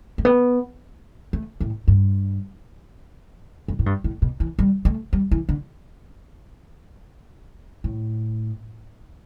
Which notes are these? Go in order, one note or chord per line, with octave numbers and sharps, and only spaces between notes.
A3
B3
A3
A2
G2
G2
A2
G2
A2
B2
E3
G3
A3
G3
E3
D3
A2